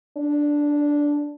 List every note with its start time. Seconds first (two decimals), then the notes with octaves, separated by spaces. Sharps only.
0.17 D4